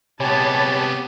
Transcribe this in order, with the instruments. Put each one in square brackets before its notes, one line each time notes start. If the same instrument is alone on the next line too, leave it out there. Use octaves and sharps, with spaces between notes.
[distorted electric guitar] C3 B3 [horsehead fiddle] G#3 A5 [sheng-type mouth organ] G4 [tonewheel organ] C#5 G#5 B5